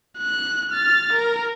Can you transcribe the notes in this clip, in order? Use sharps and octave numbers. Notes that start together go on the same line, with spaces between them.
F#6
F6 A6
A#4